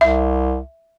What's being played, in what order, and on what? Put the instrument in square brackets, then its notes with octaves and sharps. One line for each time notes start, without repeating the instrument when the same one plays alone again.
[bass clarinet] C2 [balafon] E5